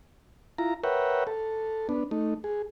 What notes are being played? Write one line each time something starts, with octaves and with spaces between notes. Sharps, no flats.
E4 F4 A#5
A#4 B4 C#5 E5 F#5 G5
A4
B3 D4
A3 D#4
G#4